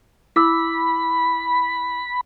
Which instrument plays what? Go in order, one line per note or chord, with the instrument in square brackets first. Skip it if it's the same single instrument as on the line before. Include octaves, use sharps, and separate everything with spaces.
[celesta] E4 D6 E6 [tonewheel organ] B5